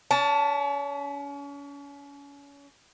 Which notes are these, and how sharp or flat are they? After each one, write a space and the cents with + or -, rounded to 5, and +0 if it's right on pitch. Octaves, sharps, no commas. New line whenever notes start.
C#4 +35 A5 +0